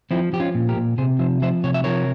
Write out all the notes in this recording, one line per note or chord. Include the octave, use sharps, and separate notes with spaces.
F3 C4 E4
F3 G4
C#4 F4
A#2
G4 A#4
A#2
C3 G#4 C5
F3 C5 E5
F3 C5 E5
C3 C#5
E5
F3 A#4 C#5